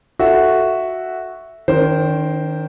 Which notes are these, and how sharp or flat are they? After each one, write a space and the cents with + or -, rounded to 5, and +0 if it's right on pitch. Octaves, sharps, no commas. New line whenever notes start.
F#4 +0 A4 +0 E5 +0
D#3 +0 C#4 +45 C5 +0